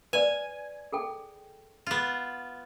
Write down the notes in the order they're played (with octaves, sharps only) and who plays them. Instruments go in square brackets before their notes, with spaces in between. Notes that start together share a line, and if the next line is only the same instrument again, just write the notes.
[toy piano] B4 D5 [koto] G#5
[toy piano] G#4 A4 G5
[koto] B3 F4